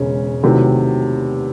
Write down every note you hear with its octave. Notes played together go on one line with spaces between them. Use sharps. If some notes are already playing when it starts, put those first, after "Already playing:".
Already playing: E1 C#3 G#3 C#4
E2 C3 D#3 F#3 A3